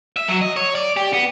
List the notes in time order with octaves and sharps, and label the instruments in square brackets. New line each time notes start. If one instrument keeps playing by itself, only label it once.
[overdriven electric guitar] E5
F#3
D#5
C#5
D5
G4
B3